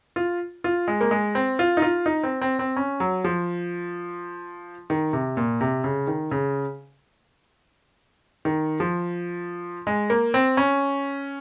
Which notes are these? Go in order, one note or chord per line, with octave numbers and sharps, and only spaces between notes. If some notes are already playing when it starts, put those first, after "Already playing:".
F4
F4
G#3
A#3
G#3
C4
F4
D#4
F4
D#4
C4
C4
C4
C#4
F#3
F3
D#3
C3
A#2
C3
C#3
D#3
C#3
D#3
F3
G#3
A#3
C4
C#4